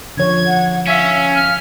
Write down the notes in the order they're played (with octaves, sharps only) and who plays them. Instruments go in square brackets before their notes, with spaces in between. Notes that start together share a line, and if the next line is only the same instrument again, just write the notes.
[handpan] D3 F3 C#5 [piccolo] G#6
[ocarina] F#5
[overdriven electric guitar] C#4 [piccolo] E5 [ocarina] F5
[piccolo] F6